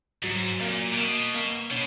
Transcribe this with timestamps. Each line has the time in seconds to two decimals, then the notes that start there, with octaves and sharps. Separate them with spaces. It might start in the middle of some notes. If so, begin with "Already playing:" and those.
0.23 G#2 F#3
0.60 A#2 A#3
0.93 A#2
0.96 B2 A#3
1.34 A#3
1.71 B2 C#4